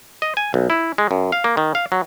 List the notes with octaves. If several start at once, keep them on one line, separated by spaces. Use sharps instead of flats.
D#5
G#5
B1
E4
G#3
F#2
F5
A#3
D#3
F5
F#3